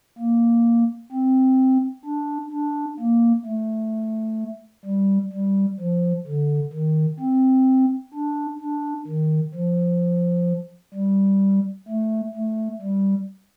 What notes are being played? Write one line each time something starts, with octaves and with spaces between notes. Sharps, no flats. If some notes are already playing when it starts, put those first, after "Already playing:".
A#3
C4
D4
D4
A#3
A3
G3
G3
F3
D3
D#3
C4
D4
D4
D#3
F3
G3
A3
A3
G3